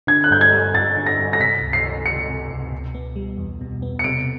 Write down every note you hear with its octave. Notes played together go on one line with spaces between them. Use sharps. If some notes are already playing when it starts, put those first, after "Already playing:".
D3 G#6
F#6
G2 G6
G#6
G3
G2 A6
D3
A#6
G2
A#6
C3 B6
C#2
C7
D#3
C#2 C#7
C3
C#2
B2
B3
G3
E2
B2
B3
C#7
C3 D7